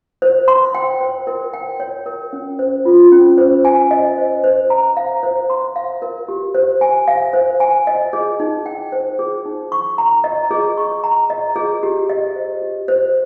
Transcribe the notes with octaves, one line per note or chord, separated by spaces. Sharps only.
C5
C6
G5
C5
A#4
G5
C#5
A#4
C#4
C5
F4
C#4
C5
G#5
D#5
C5
C5
A#5
F5
C5
C6
F5
A#4
G4
C5
G#5
F5
C5
G#5
D#5
G#4
D#4
G5
C5
G#4
D#4
C#6
A#5
D#5
G#4
C#6
A#5
D#5
G#4
G4
D#5
C5
G4
C5